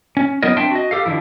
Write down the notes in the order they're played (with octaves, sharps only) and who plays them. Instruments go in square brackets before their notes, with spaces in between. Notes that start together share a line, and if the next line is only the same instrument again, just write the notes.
[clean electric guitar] C#4
F#3 B3 E4 A#4 D#5
C4 D4 E5 G5 A5 C6
F#4 D#5
G4 A4 F5
D3 D#3 F3 E4